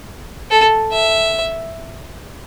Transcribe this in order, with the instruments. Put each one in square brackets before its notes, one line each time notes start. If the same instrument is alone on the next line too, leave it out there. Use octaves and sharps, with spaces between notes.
[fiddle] A4
E5